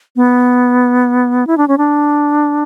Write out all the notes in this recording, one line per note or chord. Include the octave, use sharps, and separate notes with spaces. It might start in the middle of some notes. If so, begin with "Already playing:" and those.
B3
E4
D4
C#4
D4